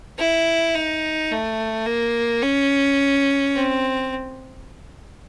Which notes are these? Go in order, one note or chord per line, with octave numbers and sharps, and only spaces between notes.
E4
D#4
A3
A#3
C#4
C4